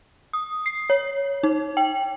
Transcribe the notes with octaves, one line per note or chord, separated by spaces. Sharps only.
D#6
C7
C#5
D#4
G5